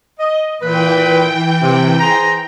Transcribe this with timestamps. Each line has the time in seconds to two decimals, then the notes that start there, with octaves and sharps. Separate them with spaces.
0.19 D#5
0.61 A#2 E3 B4 G5
1.61 C3
1.99 G#4 C5 A#5